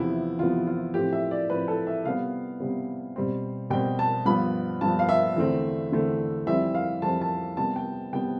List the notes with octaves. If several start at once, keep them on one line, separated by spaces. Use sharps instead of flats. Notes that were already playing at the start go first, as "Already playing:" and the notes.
Already playing: E2 C3 F3 B3 E4
E2 C3 F3 B3 F4
F4
A2 F3 C4 G4
E5
D5
A2 F3 C4 B4
A4
E5
C3 G3 B3 F5
C3 G3 B3
B2 G3 C4
B2 G3 C4 G5
A5
G2 F3 B3 B5
G2 F3 B3 A5
F5
E5
E2 D3 A3 C4
E2 D3 A3 C4
F2 E3 G3 C4 E5
F5
F2 E3 G3 C4 A5
A5
C3 G3 B3 A5
G5
C3 G3 B3 G5